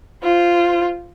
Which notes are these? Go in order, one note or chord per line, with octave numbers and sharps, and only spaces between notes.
F4 C5